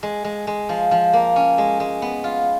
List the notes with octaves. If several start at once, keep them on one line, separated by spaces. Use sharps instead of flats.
G#3
G#3
G#3
F3
F3
A#3
C#4
G#3
G#3
B3
F4